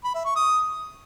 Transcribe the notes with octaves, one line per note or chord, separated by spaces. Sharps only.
B5
E5
C#6
D#6